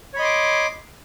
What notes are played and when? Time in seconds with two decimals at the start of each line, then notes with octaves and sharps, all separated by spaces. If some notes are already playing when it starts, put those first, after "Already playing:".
0.14 C#5
0.16 B5
0.19 D#5
0.22 C6
0.24 D6